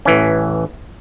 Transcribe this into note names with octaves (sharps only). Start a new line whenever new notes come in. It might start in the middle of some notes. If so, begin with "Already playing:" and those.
A1 E3 C#4